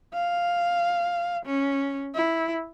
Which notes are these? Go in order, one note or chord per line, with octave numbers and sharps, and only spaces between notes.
F5
C#4
E4